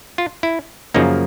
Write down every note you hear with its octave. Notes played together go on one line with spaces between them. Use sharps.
F4
E4
F#2 C#3 F3 A#3 D#4